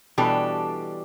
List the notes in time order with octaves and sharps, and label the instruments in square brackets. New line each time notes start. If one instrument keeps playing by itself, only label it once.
[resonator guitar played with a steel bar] B2 E3 G3 D4 G4 A4